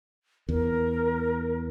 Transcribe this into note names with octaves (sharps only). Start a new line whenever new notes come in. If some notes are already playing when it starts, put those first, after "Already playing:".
E2 A#4